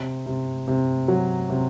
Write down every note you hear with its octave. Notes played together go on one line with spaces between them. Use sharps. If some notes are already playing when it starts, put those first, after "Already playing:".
Already playing: C3
C3
C3
F#3
C3